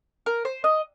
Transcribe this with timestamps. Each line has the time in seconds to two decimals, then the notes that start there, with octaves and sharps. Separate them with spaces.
0.26 A#4
0.45 C5
0.64 D#5